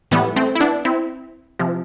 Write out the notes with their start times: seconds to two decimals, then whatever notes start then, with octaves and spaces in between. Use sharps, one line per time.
0.11 A2 E3 G3 B3
0.36 A3 C4
0.55 E4
0.61 B3 D4
0.85 C4 E4
1.59 C3 F3